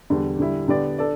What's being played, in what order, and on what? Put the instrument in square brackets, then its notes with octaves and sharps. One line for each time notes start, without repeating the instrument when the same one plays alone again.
[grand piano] E2 D3 G3
D3 G3 E4
D3 B3 G4 D5
D4 A4 D5